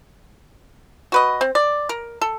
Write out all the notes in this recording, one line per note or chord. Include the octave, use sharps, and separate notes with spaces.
F#4 B4 D#5
C4
D5
A#4
A4